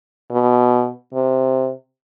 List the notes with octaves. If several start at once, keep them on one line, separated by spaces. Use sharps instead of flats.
B2
C3